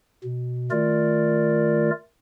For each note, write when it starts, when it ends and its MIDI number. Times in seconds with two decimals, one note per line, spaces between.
0.24 0.70 47
0.71 1.91 51
0.71 1.91 57
0.71 1.91 65
0.71 1.91 70
0.71 1.91 74